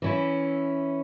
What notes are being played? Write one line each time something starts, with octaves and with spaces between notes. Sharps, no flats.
E3 C#4 E4